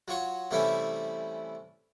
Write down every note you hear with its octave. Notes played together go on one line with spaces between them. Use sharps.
F#3 F4 C#5 F#5
C3 E3 G3 A3 C#4 E4